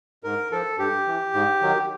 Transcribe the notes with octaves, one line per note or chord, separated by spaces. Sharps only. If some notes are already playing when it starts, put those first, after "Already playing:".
G#2 A#4
F3 A4
G2 G4
E3
G#2
D#3 F#3